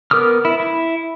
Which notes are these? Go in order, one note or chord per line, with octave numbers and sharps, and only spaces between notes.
B3 A#4 D6 D#6 F6
E4
E4